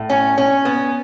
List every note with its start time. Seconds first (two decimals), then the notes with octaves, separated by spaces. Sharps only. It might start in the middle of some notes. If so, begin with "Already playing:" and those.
Already playing: A2
0.10 C#4
0.38 C#4
0.65 B3